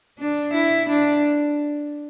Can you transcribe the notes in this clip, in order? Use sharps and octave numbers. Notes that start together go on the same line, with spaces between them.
D4
E4
D4